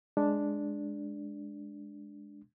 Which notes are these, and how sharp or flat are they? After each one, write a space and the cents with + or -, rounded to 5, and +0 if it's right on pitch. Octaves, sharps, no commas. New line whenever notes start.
G#3 +0 D4 +0